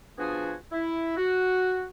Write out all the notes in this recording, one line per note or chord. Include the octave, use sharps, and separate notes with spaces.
F3 B3 D4 F4 F#4 G#4
E4
F#4